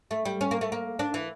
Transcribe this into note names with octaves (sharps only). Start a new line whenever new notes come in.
A3
G3
C#4
A#3
A3
A#3
D4
E3